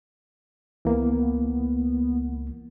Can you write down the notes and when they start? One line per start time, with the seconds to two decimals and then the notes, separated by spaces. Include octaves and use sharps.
0.85 C#2 E3 A#3 B3